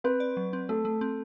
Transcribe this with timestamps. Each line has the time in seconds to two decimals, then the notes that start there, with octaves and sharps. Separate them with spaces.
0.04 C4 B4
0.20 D5
0.37 F#3
0.53 C4
0.69 A3 A4
0.85 A3
1.01 C4